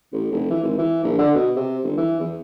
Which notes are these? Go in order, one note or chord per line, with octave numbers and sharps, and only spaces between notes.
A1
F1
E3
G#1
E3
A#1
D3
B2
C3
G1
E3
E2